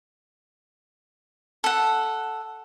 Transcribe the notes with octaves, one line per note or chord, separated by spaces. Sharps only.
A4 F#5